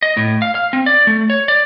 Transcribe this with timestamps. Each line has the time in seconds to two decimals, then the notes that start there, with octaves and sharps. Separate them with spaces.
0.02 D#5
0.17 A2
0.42 F5
0.55 F5
0.73 C4
0.86 D5
1.07 A3
1.30 C#5
1.48 D5